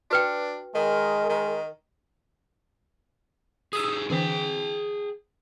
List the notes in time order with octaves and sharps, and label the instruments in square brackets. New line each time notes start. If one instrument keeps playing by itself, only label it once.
[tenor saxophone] D4 [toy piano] F#4 B4 G5
[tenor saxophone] D#3 [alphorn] G#3 [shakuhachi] A#4
[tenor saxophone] D#3
[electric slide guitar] D#4 G4 G#4 [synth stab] D#6 E6
[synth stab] D3 E3 C4 [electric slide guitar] G#4 G5